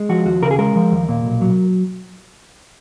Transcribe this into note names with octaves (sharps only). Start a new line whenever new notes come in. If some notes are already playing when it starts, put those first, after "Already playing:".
Already playing: G#3
F3 F#4
D#2 F#4
C#3 A#4
G#4
G#3 A#4
F3
D#2
A#2
B1
F#3